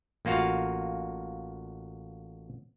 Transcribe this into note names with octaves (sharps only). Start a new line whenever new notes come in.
A1 A#3 F4 F#4 F5